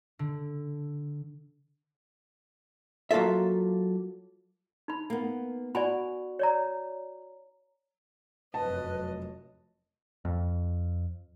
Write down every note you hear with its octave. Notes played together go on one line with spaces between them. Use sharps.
D3
F#3 A#3 F4 A4 E5
D#4 B5
A#3 B3
F#4 D5 G#5 B5
C#5 D5 A#5
F1 F#2 B4 D#5 A5
F2